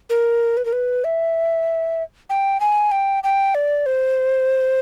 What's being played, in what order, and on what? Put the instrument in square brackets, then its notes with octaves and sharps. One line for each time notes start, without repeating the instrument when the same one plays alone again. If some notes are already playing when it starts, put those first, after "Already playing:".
[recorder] A#4
B4
A#4
B4
E5
G5
G#5
G5
G5
D5
C5